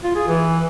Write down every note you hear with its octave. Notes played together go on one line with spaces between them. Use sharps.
F4
G#4
E3